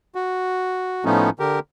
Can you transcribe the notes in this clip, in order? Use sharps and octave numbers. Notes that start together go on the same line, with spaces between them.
F#4
A2 F3 A3 B3 C#4 D#4
D3 G4 A#4